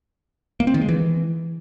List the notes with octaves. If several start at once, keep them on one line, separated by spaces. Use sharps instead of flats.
A#3
C4
D#3
G#3
E3